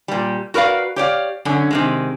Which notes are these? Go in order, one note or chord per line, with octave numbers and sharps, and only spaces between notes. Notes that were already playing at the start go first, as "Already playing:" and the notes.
A#2 G3
F#4 A#4 B4 D5 F5
G4 C#5 D5 F5
F#2 D3 C#4
C3 D#3 G#3